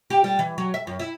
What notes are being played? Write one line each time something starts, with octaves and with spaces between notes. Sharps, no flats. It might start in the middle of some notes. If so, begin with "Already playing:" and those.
G4
G3
E3
F#3
E5
F#2
E4